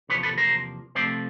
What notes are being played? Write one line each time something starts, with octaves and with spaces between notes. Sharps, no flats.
E2 C3 F3 A#3 B4 C#5
A4 B4
A#4 C5
C3 F3 A3 C4 F4 C5 D5